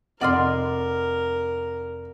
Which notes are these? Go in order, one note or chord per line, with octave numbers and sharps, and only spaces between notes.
F1 A#4 D5 D#5 F#5 C6 D6 F6